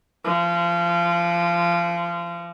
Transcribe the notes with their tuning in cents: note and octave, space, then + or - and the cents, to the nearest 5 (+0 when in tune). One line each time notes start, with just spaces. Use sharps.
F3 -25